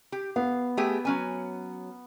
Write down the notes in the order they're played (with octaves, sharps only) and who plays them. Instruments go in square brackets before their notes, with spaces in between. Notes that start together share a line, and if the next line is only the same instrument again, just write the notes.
[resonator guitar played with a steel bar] G4
[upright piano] B3 [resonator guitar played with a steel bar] F5
[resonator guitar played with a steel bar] A3 G4 G#4
F#3 C#4 G#5